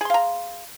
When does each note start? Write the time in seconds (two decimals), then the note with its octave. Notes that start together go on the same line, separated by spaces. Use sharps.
0.01 G#4
0.05 C6
0.10 F5
0.14 A#5